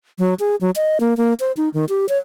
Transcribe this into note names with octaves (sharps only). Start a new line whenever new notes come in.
F#3
G#4
F#3
D#5
A#3
A#3
C5
D#4
D#3
G4
C#5